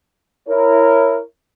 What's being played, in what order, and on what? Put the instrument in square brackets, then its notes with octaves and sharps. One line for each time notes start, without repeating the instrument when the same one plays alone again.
[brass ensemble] E4 A#4 C#5